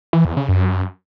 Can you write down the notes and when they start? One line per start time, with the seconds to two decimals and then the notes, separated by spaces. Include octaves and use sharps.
0.13 E3
0.25 E2
0.37 C#3
0.49 F#2